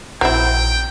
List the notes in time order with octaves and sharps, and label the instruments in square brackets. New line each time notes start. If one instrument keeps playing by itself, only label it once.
[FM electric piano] A#1 [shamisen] F#3 C4 E4 [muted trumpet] G5